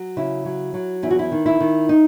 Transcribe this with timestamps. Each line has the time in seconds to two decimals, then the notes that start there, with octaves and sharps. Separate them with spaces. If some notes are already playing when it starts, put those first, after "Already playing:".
Already playing: F#3
0.17 C#3 E4
0.45 F#3
0.74 F#3
1.03 E2 E4
1.11 F#4
1.19 E4
1.32 D#3
1.46 E4
1.60 D#3
1.89 D#4